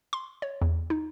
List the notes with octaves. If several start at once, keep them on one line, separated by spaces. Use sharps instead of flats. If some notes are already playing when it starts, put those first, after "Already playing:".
C6
C#5
E2
D#4